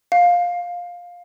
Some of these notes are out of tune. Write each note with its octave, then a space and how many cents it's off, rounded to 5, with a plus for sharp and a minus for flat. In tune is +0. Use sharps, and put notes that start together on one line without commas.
F5 +15